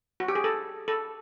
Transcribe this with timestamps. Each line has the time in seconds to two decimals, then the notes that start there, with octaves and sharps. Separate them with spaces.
0.20 F#4
0.28 G4
0.35 G#4
0.44 A4
0.88 A4